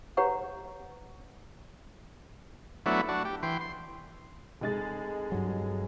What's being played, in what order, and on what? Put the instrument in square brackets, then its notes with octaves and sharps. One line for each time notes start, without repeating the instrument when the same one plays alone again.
[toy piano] G4 B4 C#5 F#5 A#5 C#6
[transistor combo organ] F#3 A3 B3 D4 E4
D4 F#4
G4
E3 G5 C6
C6
[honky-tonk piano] F1 G#3 A6
[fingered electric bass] G2 F#3